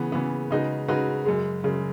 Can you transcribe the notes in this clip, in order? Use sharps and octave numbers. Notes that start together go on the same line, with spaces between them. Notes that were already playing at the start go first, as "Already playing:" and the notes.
Already playing: C#3 E3 B3
C#3 E3 B3
C#3 G#3 D#4 F#4 B4
C#3 G#3 D#4 F#4 B4
F#2 C#3 G#3
F#2 C#3 G#3